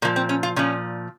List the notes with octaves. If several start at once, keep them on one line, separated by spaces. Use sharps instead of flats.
A#2 F3 A#3
C4
C#4
F4
A#2 F3 C#4